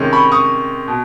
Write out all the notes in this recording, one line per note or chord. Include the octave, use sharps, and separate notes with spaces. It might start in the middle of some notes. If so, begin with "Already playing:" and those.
Already playing: C3 D#3 G#3 C#4
B5 C#6
C#6 D#6
B2